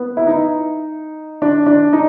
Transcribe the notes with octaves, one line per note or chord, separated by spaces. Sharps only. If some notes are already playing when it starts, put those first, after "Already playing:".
Already playing: B3
E4
D#4
D4
D4
D#4